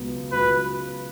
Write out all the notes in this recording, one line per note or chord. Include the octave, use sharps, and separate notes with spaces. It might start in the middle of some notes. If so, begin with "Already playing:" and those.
Already playing: C#2 B2 F#3 B3
C#2 B2 F#3 B3 B4